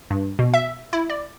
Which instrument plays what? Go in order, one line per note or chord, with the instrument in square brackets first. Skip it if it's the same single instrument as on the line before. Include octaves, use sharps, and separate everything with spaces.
[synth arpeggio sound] G2
B2
E5
E4
D5